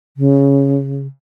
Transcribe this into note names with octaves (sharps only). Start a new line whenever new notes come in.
C#3